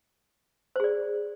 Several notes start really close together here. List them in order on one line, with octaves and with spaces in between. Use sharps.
C5 G#4 D5